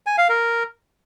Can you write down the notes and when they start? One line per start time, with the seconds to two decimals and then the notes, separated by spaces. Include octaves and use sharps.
0.06 G#5
0.18 F5
0.29 A#4